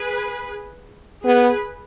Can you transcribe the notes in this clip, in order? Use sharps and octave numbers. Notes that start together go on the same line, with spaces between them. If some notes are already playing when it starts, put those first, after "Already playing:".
Already playing: G#4 B4
B3 G#4 B4